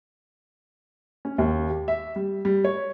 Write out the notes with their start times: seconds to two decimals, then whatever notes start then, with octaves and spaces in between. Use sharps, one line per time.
1.25 C#4
1.38 D#2
1.70 G4
1.88 E5
2.16 G3
2.45 G3
2.65 C#5